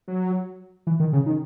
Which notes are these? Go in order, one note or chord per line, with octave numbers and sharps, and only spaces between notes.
F#3
E3
D#3
C#3
D#3